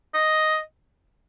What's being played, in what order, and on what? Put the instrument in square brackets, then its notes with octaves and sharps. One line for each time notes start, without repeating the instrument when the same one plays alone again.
[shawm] D#5